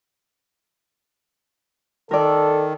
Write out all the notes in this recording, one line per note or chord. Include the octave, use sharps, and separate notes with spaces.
D#3 A4 A#4 D5